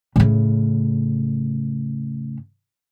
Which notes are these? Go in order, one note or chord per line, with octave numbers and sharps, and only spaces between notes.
A2 C#3